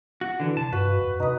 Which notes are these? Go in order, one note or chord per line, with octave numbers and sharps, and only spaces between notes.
F#4
D3 E3
C3 A5
G2 F#4 B4
F2
C3 D#4 D#6